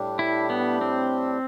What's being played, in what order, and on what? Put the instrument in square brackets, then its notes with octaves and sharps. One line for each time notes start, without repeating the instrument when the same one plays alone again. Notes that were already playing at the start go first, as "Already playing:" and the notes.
Already playing: [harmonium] A2 G3 D4 G4
[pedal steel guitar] E4
B3
C4